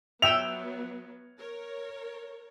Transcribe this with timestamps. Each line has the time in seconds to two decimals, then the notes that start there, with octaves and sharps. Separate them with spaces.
0.22 F#3 B3 E5 G5 E6 F7
1.39 A#4 C#5